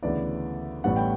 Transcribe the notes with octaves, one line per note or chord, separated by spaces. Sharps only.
D2 C#3 E3 B3 B4 D5
A1 A2 G3 B3 F#5
G5